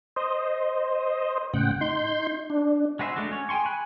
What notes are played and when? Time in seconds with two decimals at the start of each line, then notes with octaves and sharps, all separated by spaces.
0.16 C5 D#5
1.54 A2 C#3 F#5 G5
1.81 D#4 C6 G6
2.50 D4
2.99 G#3 F#4 B4 C5 E5
3.16 G#3 A3 D4 F#4
3.31 C#4 C#5
3.49 G#4 G5 G#5 C6 C#6
3.66 G#5 B5 F#6